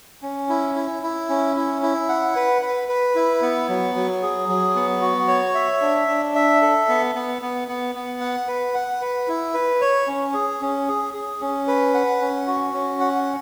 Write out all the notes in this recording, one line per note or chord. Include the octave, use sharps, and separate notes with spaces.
C#4
E4
E4
E4
C#4
E4
E4
F#5
B4
B4
B4
E4
B3
F#3
F#3
G#4
F#3
B3
F#4
C#5
E5
D4
D4
E5
A4
B3
B3
B3
B3
B3
F#5
B4
F#5
B4
E4
B4
C#5
C#4
G#4
C#4
G#4
G#4
C#4
B4
F#5
C#4
F#4
C#4
F#5